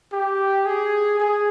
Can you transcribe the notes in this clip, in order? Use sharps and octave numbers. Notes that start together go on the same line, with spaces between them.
G4
G#4
G#4